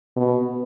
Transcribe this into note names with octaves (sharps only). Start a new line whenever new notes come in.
B2